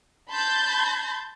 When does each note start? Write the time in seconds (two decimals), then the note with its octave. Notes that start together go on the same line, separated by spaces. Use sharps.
0.31 A5 B5 C6 G6 A6